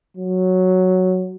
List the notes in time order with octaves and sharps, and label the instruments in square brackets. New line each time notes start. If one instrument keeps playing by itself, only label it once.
[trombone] F#3